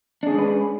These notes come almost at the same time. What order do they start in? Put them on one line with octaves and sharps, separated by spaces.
D4 G#4 C#4 G#3 B4